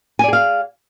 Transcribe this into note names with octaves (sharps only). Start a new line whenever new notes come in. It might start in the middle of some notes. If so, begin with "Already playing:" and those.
G#4 D5 F5 G#5